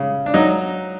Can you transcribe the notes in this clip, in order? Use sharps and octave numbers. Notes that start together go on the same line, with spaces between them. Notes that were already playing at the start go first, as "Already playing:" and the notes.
Already playing: C#3
D4
F#3 D#4